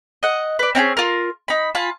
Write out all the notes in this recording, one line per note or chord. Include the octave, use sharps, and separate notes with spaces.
D#5 F#5
B4 D5
C4 C#4 F4 G#4
F4 A#4
D#4 B5
F4 G#5 A5 B5